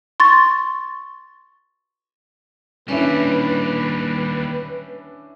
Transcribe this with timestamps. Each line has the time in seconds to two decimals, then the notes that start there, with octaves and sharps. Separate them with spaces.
0.20 C6 C#6 A6
2.88 D#2 G3 C#4 D4 E4 B4